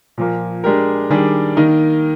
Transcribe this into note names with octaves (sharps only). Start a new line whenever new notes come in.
A#2 F3 A#3
G#3 D4 G4 A#4
D#3 G3 D4 G#4
D#3 A#3 D#4 A#4